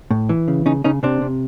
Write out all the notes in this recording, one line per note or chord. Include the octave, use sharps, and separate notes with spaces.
A2
E3
C#3
C#3 C#4 D#4
C#3 C#4 D#4
C3 C4 D4
C3